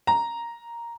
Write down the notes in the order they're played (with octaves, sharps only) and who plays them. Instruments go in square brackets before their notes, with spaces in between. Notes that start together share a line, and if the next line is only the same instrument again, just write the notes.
[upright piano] A#5